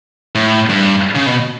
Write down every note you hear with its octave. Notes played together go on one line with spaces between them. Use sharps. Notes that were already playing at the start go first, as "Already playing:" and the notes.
A2
G2
C#3
B2